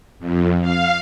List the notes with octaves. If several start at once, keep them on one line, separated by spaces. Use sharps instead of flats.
F2
F5